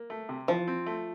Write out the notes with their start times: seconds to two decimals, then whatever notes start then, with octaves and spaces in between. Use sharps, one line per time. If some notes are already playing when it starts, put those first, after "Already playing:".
Already playing: A#3
0.10 A3
0.29 C3
0.48 E3 F3
0.67 C4
0.86 A3